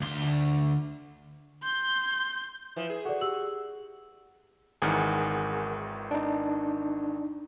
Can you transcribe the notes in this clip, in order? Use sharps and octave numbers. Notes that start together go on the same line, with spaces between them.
D2 C6
C6 G6
E3 F3
G#4
F#4 A4 D5
G4 E6 F#7
G#1 D#3 E3 G#4 A#4 F#5
D4 D#4